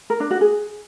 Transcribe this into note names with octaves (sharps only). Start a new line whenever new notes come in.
A#4
D4
F#4
G#4